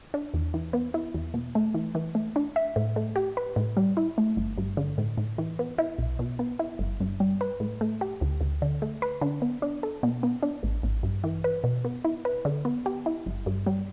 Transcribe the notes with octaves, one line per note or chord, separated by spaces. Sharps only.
D4
E2
E3
B3
E4
E2
B2
A3
E3
E3
A3
D4
E5
A2
A3
G4
B4
A2
G3
E4
A3
G1
G2
D3
A2
A2
E3
B3
E4
B1
B2
B3
E4
G1
G2
G3
B4
A2
A3
G4
D2
D2
D3
A3
B4
D3
B3
D4
A4
B2
B3
D4
A1
A1
G2
E3
B4
B2
B3
E4
B4
D3
B3
G4
E4
G1
G2
G3